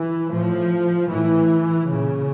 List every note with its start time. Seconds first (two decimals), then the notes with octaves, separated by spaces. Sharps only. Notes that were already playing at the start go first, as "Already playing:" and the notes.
Already playing: E3
0.30 A2 F3
1.09 A2 E3
1.87 A#2 C#3